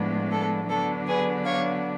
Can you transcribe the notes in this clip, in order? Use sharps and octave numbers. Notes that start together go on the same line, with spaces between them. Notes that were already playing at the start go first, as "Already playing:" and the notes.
Already playing: A2 F3 G#3 B3 D4
A4
D3 F#3 B3 D4 A4
G#4 B4
C#5 F5